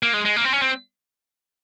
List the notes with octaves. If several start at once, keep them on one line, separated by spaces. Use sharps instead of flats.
A#3
G#3
G#3
A#3
C4
C#4
C4